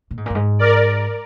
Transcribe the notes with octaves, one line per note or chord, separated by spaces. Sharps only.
A#2
G#2
A#2
F#2
G#2
A#4 D5